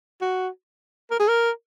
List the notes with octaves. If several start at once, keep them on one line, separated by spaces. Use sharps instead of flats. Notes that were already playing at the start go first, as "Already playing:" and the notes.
F#4
A#4
G#4
A#4